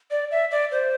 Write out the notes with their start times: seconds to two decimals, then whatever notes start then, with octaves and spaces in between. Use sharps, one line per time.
0.11 D5
0.31 E5
0.51 D5
0.71 C5